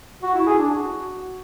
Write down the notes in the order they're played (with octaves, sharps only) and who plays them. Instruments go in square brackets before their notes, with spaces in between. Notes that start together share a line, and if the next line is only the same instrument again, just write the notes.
[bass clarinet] F#4
E4
G#4
D4
F#4